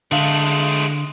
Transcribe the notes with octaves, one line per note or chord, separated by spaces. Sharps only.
D3 G#3 A3 F5